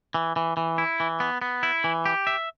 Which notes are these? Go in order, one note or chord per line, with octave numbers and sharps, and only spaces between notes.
E3
E3
E3
E4
E3
B3
B3
E4
E3
G4
E5